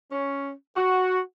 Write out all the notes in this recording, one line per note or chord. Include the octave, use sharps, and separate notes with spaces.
C#4
F#4